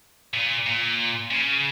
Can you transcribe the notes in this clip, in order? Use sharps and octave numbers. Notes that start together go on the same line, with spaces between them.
A#2
A#2
C#3